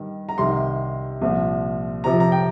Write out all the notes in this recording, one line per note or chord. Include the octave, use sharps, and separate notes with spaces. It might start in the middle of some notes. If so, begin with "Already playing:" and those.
Already playing: G2 D#3
A#5
C2 C3 D#3 C6
C2 A#2 F3
F2 C3 F3 A#5
A#5
G5